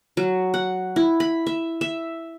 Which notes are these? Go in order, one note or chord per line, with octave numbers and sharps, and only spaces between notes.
F#3
F#5
E4
B5
E5
E5